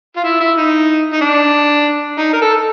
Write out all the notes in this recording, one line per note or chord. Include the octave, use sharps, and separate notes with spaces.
F4
E4
E4
D#4
D#4
D4
D#4
A#4
A4